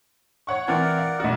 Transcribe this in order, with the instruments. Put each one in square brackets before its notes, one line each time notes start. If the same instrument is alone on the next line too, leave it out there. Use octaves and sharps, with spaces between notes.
[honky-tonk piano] C#5 F#5 C#6
[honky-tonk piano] E3 C4 F6 [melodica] A#4 D5 F#5
[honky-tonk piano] F5
[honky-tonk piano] B1 F#4 [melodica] D5